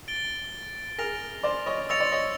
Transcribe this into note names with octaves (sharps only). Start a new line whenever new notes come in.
A6 D7 G7
G#4 A#4 F6 A#6 D7 F7
C5 D5
C#5 D#5
C#5 D#5 E6 A6 C#7 F7
C5 D5
C#5 D#5